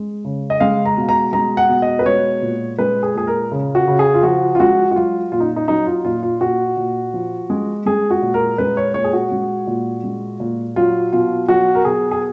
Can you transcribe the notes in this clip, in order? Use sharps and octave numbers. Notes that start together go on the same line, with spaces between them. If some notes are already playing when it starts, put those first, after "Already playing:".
Already playing: G#3
C#3
D#5
G#3 F5
A#5
B2
A#5
G#3 A#5
F#5
B2
D#5
B4
G#3 C#5
A#2
G#3 B4
G#4
A#2 G#4
A#4
C#3
F#4
C#3
G#4
F4
F3 F#4
F4
G#3 F#4
F#4
F#3 F4
A#2 F4
D#4
D#4
F#3 D#4
F4
A#2 F4
F4
A#2 F#4
A#2
F3
G#3
G#3 G#4
F#4
A#2
A#4
G#3 B4
C#5
A#2 C#5
G#4
F#4
G#3
A#2
G#3
A#2
F#3 F4
B2 F4
F#3 F#4
A#4
B2 G#4
G#4